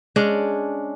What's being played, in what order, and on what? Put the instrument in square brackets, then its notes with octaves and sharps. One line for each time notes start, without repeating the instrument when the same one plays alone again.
[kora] G#3 C#4 D4